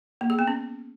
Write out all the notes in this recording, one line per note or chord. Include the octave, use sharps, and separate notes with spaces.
A#3
G#4
B3
C#4